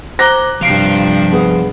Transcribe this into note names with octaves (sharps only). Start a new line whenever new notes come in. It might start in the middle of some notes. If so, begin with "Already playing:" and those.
C5 A#5 D6 F#6 A#6 G7
G2 C3 F3 F5 C7 D7 F7
B3 G#4